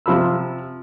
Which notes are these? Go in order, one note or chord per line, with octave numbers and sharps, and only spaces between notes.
C3 F3 B5 E6